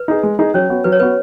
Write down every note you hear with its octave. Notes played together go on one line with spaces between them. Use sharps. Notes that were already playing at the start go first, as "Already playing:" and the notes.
Already playing: B4
D#4 G#4
G#3
D#4 G#4
F#3 C#4 C#5
B3 F#4
F#3 B4
C#5
B3 F#4 B4